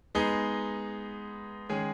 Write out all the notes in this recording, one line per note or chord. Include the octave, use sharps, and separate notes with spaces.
G#3 B3 D#4 G#4
D#3 G#3 C#4 G#4